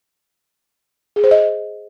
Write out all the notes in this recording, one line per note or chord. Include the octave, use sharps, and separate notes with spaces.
G#4
C5
D#5